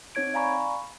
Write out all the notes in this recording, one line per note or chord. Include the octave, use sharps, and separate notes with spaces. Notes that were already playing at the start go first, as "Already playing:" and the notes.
C4 D#4 C#5 G#6 D7
D5 F5 G#5 A#5 B5 C#6